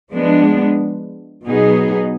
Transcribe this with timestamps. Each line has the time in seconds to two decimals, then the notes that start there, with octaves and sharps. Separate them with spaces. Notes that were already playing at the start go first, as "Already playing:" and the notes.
0.14 F3 G#3 B3 D4
1.46 B2 F#3 B3 D#4 G#4